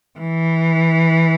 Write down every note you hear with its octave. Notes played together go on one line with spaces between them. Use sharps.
E3